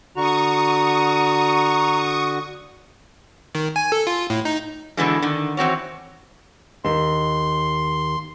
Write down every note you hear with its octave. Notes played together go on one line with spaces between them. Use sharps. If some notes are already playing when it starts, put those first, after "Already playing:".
D3 F#4 A#5 C#6 D#6
D#3
G#5
A4
F4
A2
D#4
B2 D3 E3 G#3
D3 D#3
E3 C4 F#4 C#5
D#2 C6